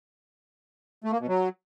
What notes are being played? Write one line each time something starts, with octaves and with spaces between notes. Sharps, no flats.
A3
A#3
B2
F#3